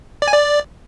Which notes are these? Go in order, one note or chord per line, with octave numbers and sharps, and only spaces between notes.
D5
G#5
D5